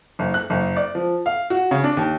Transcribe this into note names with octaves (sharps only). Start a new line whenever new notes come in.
F#1
F#6
F#1
D5
F3
F5
F#4
C#3
D4
D#2